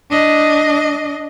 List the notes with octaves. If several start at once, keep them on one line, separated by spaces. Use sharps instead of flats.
D4 D#5